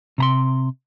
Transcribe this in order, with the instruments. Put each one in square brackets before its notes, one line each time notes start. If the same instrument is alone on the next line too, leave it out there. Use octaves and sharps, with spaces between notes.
[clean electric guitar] C3 A#5 C6